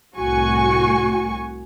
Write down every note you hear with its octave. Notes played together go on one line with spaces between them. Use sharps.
C2 A2 F#4 G#5 C#6